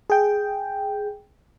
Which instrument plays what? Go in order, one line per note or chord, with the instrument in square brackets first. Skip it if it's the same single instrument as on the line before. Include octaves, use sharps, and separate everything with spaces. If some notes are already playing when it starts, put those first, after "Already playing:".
[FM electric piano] G#4 G5